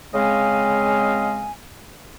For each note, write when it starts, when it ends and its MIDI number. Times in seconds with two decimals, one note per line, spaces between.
0.14 1.51 49
0.14 1.51 56
0.14 1.51 60
0.14 1.51 75
0.14 1.51 77
0.14 1.51 80